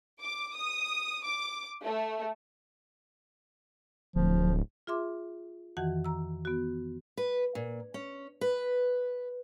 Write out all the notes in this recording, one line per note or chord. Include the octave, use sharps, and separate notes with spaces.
D6
D#6
D6
A3
D1 F3
F4 G#4 E5 C6 D6
F2 D#3 E3 F#4 F#5
A#5 E6
B3 F#4
B4
A#2
C#4
B4